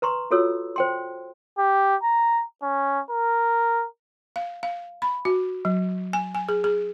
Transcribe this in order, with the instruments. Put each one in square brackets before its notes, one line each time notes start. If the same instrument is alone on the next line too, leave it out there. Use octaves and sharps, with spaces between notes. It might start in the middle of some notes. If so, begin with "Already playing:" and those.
[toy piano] B4 A#5 C6 C#6
F4 F#4 A4 C#5 E6
C5 G5 C6
[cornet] G4
A#5
C#4
A#4
[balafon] F5
F5
B5
F#4
F#3
G#5
G#5
G#4
G#4